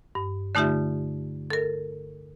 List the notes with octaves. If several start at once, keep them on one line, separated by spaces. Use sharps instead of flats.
G2
D3 A3 D#4 F4 G4 E5
A4 A#4